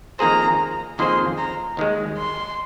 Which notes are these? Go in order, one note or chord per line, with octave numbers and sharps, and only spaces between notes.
F2 D#3 A#3 G#4 C5 A#5
F2 D#3 A#3 G#4 C5 C6
A#5
D#2 D#3 G#3
C6